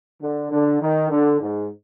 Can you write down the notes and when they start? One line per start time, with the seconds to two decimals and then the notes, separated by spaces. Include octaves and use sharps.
0.22 D3
0.51 D3
0.81 D#3
1.10 D3
1.41 G#2